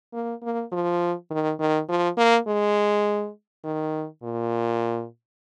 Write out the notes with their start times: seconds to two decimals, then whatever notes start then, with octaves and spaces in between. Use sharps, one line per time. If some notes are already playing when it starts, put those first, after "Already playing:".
0.13 A#3
0.43 A#3
0.72 F3
1.31 D#3
1.60 D#3
1.89 F3
2.18 A#3
2.48 G#3
3.65 D#3
4.23 A#2